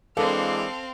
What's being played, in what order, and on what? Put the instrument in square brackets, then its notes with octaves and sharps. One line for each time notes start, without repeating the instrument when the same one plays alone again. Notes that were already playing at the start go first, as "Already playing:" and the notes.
[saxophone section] E3 G#3 [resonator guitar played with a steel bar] A#3 D4 [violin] C4 F5 [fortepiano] A4